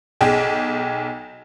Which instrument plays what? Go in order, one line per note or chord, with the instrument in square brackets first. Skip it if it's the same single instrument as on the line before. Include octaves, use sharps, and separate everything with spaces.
[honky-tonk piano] B1 G#4 G5